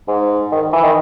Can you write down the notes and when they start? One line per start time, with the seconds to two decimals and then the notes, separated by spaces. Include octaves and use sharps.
0.08 G#2
0.52 D#3
0.73 E3
0.84 D#3